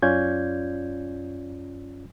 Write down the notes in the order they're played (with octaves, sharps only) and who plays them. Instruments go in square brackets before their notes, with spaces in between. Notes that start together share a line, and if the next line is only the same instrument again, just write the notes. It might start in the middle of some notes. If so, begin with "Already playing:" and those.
[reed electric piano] F#2 C#4 F4 D5 G6 G#6